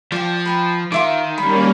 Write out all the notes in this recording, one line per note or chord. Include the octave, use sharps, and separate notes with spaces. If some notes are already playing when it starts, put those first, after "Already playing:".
F3 D5 G5
B4 G5 A#5
D#3 F4 E5 D6
G3 A#3 C#4 B5